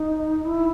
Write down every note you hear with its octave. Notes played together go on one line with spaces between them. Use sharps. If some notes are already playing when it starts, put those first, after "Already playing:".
Already playing: D#4
E4